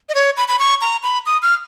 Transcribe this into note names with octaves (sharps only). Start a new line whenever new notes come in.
D#5
C#5
B5
B5
C#6
A#5
B5
D#6
F6